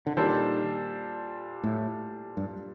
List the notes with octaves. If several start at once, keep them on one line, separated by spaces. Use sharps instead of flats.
D3
A#2 D#3 G3 D4 A4 C5
A2
G2